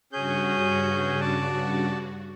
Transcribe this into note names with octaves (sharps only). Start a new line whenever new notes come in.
G2 C#3 C#4 F#4 G#4 G6
D5 A5